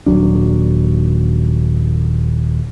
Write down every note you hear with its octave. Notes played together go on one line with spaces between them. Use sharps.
D#1 F2 F#3 D4